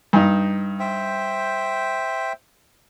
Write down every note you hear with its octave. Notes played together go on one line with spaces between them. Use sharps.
G2 D#4
C5 E5 G5